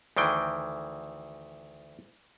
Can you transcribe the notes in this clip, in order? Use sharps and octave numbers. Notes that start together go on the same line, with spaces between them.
D2 D#3 E3 G5